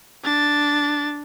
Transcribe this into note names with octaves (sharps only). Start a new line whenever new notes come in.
D4 A6